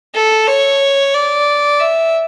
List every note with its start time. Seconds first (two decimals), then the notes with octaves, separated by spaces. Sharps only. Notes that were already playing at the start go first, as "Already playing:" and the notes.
0.15 A4
0.48 C#5
1.14 D5
1.80 E5